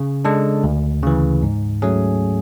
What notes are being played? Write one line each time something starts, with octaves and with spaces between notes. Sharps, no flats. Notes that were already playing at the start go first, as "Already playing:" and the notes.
Already playing: C#3
G#3 D4 A4
D2
C#3 E3
G#2
F#3 A3 C#4 G#4